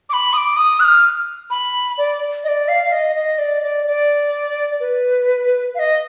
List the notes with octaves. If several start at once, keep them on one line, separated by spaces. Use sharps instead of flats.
D6
B5
D#6
D6
D#6
F#6
F6
B5
D5
D#5
D5
F5
F5
D#5
D#5
D5
D5
D5
B4
F5
D#5